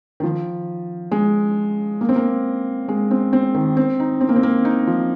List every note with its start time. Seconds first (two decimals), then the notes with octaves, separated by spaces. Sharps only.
0.20 D#3
0.23 F3
1.11 G#3
2.01 A#3
2.09 C4
2.16 A#3
2.88 G#3
3.11 C4
3.33 C4
3.55 D#3
3.77 C4
4.00 D#4
4.21 C4
4.29 A#3
4.36 C4
4.43 A#3
4.65 D#4
4.87 F3